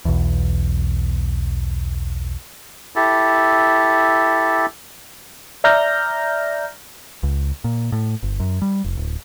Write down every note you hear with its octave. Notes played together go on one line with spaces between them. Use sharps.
B1 E2
E4 G4 A4
D5 E5 A#5 F6 G6 A#6
C#2
A#2
A2
G1
F#2
G3
F1
D1